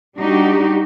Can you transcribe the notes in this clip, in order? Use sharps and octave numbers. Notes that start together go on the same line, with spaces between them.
G3 D4 D#4 F#4 G4